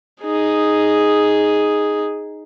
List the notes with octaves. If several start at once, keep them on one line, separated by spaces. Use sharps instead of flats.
D#4 G#4